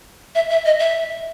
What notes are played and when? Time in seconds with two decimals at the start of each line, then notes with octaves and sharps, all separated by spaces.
0.35 E5
0.50 E5
0.66 D#5
0.79 E5